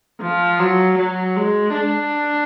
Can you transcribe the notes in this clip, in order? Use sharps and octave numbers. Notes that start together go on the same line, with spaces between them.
F3
F#3
F#3
G#3
D4